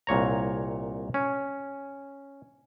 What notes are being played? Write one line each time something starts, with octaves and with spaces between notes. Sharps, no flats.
C2 A#2 C#5 A#5
C#4